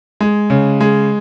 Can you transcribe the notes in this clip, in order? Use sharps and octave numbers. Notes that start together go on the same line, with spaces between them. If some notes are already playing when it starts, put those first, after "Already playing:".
G#3
C#3
G#3